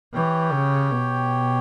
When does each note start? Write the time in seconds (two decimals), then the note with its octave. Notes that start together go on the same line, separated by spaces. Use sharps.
0.13 E3 G4 C#5 G5
0.52 C#3
0.91 B2